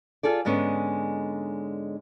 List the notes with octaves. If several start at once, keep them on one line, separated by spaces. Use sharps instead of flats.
F4 G#4 A4 D5
G#2 D3 G#3 B3 C#4